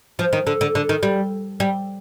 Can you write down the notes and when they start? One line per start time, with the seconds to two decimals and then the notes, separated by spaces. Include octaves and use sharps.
0.19 F3
0.33 D#3
0.47 D3
0.61 D3
0.75 D3
0.89 D#3
1.03 G3
1.60 G3